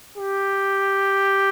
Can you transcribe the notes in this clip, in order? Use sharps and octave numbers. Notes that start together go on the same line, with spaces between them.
G4